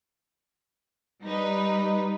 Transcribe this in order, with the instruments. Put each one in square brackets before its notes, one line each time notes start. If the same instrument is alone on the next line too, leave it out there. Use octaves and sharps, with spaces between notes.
[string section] G3 D#4 B4